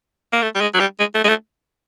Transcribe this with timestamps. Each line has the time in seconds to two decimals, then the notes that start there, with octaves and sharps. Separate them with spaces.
0.33 A#3
0.42 A3
0.55 G3
0.61 G#3
0.74 F#3
0.80 G3
1.00 G#3
1.15 A3
1.24 G#3
1.29 A3